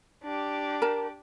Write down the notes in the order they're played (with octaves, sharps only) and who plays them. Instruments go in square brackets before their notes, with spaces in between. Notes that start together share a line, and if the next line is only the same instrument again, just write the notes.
[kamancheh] D4 G4
[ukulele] A#4 A5